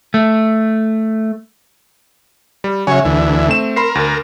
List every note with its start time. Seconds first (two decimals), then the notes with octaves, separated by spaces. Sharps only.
0.14 A3
2.64 G3
2.87 C#3 F#3 C#5 E5 G#5
3.05 D2 E3
3.49 A3 C4 E7
3.76 A#4 B5 C6 C7
3.95 D2